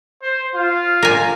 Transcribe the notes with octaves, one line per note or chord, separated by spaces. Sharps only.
C5
F4
A#4 G#5